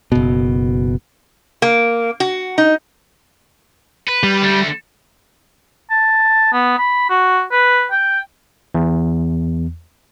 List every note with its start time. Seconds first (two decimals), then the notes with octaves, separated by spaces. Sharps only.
0.12 F#1 B2
1.62 A#3
2.20 F#4
2.58 D#4
4.08 B4
4.23 G3
4.42 D3 A3
5.91 A5
6.53 B3
6.78 B5
7.10 F#4
7.52 B4
7.91 G5
8.74 E2